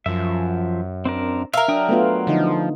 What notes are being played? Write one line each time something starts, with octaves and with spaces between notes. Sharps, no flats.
F#2 F3 E5
C4 D4 A#4
A#4 E5 F5
F#3 D4 G5 D#6
A3 B3 F4
D3 F3 D#4